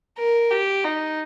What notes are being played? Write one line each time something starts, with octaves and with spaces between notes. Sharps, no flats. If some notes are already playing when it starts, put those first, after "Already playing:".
A#4
G4
D#4